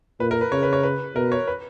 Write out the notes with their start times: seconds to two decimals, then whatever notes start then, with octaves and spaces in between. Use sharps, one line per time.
0.20 A#2 B4
0.31 A#4
0.41 B4
0.52 C#3 C#5
0.63 B4
0.73 C#5
0.83 B4
1.15 B2 A#4
1.32 C#5
1.48 B4